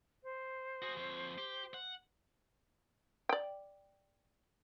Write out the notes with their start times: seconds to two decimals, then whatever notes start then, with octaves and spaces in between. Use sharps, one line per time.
0.23 C5
0.82 F#4 G#4
0.97 F2 C#5
1.38 G4
1.74 F#5
3.29 D5 G5